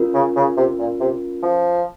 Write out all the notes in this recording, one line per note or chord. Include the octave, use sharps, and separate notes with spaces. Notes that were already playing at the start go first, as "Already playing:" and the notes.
Already playing: C#4 F4 A#4
C#3
C#3
C3
A#2
C3
F3